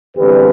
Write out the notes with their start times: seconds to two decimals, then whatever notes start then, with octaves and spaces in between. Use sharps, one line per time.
0.15 E2 D3 G3 C4 G4 B4